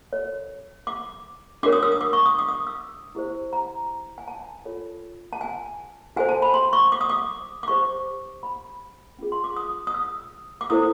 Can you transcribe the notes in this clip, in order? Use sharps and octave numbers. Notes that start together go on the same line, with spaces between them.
F#4 A4 C#5
D6
D4 F#4 A#4 C#5 D6
D#6
E6
D#6
D6
C#6
D#6
D6
D#6
E6
E4 G4 C5
A#5
G#5
A5
F4 A4 C#5
A5
G#5
F#4 A4 C5 G#5
A5
B5
C6
C#6
D6
D#6
D6
D6
D#4 G4 C5 C#6
B5
C#4 F4 G#4
C6
D6
D#6
D#6
E6
D6
E4 A4 C5 D#6